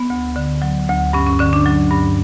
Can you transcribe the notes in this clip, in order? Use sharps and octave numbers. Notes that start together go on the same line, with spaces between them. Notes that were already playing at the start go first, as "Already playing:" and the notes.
Already playing: B3
D2
D3
F#3
D2
G2 C#4
C#4
D3 C#4
D4
F#3
G2